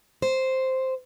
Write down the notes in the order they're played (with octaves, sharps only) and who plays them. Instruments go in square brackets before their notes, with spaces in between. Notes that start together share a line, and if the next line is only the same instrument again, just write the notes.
[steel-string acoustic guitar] C5